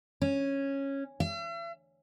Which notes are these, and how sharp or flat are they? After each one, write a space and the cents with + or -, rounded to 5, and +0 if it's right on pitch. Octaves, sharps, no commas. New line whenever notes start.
C#4 -10
E5 +45